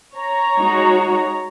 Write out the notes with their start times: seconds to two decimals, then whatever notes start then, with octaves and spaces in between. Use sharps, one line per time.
0.16 C#5 A#5
0.58 G#3 D#4 F#4